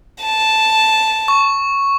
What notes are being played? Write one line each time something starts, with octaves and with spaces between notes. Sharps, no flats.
A5
C#6